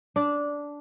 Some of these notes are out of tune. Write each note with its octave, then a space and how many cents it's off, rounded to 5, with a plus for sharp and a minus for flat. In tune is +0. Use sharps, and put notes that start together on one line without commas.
D4 -10